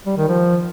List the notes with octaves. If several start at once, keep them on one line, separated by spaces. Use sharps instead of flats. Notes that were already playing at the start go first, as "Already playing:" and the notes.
G3
D#3
F3